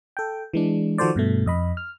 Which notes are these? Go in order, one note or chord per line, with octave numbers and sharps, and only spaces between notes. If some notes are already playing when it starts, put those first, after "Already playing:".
A4 G5
E3 G#3 D4
D#3 F3 F#4 A4 C5 D5
G2 B2 A3
F2 D#5 B5
F6